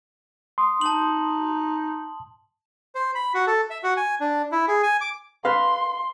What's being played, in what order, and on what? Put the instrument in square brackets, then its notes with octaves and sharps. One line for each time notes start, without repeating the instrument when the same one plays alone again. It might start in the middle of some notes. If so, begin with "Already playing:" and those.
[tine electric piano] C6 D#6
[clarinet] D#4 [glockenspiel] A5 F#7
[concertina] C5
B5
F#4
A4
E5
F#4
G#5
D4
E4
G#4
G#5
D6
[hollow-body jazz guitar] B4 F5 [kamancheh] C6